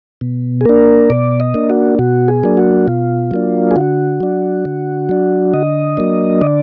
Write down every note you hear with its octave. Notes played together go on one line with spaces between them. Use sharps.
B2
G#4
A#3 D4 A#4
B2 D5
D#5
A#3 D4
F#4
B2 F#4
G#4
F#3 A#3 D4
F#4
B2 F4
F#3 A#3 D4
G#4
D3 F#4
F#3 D4
D3
F#3 D4
D3 D#5
F#3 A#3 D4
D3 D5